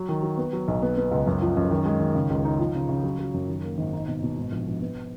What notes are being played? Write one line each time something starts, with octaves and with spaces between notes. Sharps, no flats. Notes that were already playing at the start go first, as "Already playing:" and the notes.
Already playing: F#3
D#3
F#3
B3
F#3
B1
B3
B3
C#2
F#2
F3
F#2
D#3
G#3
D#3
C#3
C#2
D#4
F3
C#3
C#3
F#3
F#3
F#2
D#3
A#3
G#1
D#4
B2
B2
G#2
A#1
A#1
B3